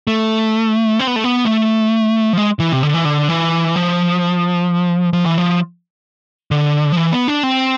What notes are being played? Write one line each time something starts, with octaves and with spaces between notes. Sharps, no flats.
A3
C4
B3
A3
B3
A3
F3
G#3
E3
C3
D3
E3
D3
E3
F3
F3
E3
F3
D3
F3
E3
B3
D4
C4